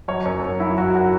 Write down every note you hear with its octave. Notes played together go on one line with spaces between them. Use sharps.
F#3 C#5
F#2 C#5
F#2
F#3 E4
F#3 F#4
F#3 F#4